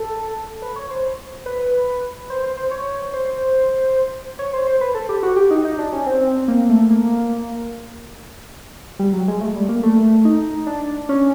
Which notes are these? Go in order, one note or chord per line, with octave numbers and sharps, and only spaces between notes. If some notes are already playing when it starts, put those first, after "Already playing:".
Already playing: A4
B4
C#5
C5
B4
C5
C5
C5
C#5
C5
C#5
C5
C5
B4
A4
G4
F#4
G4
D#4
D#4
D4
C#4
C4
A#3
A3
A#3
G3
F#3
G#3
A3
G3
A#3
A3
D#4
D4
C#4